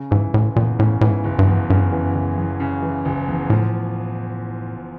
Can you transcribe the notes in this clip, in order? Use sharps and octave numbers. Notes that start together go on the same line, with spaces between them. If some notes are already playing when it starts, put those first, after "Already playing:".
Already playing: C#3
G#2 E3
F#1 A2
E2 A#2
A2 C#3
A2 E3
G#2
F#1
G2
E2
G2 C#3
F#2
F2 E3
F#2
F#1
E2
C#3
E3
F#1
E2
A2 F3